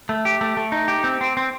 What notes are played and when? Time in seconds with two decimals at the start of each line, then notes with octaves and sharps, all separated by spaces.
0.09 A3
0.25 G4
0.41 A3
0.57 A3
0.72 D#4
0.88 G4
1.04 C4
1.21 C4
1.37 C4